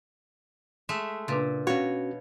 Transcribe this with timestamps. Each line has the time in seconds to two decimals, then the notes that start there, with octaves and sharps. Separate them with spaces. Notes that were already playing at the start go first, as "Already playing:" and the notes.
0.89 G#3 A3 E5
1.28 A#2 C#3 D4 B4 C6
1.67 B2 C#4 F#4 C#5 F5